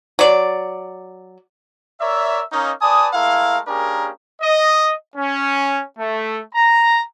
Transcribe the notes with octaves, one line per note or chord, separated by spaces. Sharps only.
F#3 D5
A#4 C#5 D5 E5
A#3 C#4 D#4
B4 D5 G#5 A5 D#6
G#3 A3 E4 A#4 F5
A#3 C#4 D4 G4 G#4 A#4
D#5
C#4
A3
A#5